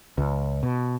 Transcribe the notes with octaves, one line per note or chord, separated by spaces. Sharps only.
C#2
B2